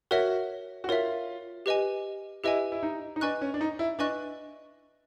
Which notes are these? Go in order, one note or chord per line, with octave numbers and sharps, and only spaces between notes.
F#4 A#4 C#5 E5
F#4
F4 A#4 C#5 E5
G4 B4 D#5 G#5
E4 G4 B4 D#5 G#5
E4
D#4
D#4
D4 B4 D#5 G#5 C#6 F#6
C#4
D4
D#4
E4
D4 B4 D#5 G#5 C#6 F#6